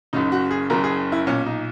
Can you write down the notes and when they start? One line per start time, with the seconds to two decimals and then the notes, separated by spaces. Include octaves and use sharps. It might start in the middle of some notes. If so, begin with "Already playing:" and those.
0.13 F#1 F#2 C#3 D#4
0.32 F#4
0.51 G#4
0.70 F#1 F#2 C#3 A#4
0.84 G#4
1.12 E4
1.26 B1 A#2 C#4
1.46 D#4